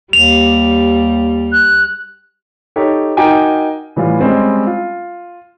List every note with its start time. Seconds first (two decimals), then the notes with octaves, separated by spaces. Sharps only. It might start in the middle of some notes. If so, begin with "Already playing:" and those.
0.13 D#2 G3 F7
1.52 F#6
2.76 D#4 G4 A4 C#5
3.17 D#4 F#4 A#4 G5 G#5 D6
3.96 A2 E3 G3 F4
4.19 G3 G#3 C4 C#4
4.67 F4